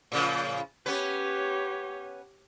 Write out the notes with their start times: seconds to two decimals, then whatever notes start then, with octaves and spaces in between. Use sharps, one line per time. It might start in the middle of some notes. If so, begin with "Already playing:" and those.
0.12 A2 C#3 F3
0.86 B3 C#4 G4 B4 C#5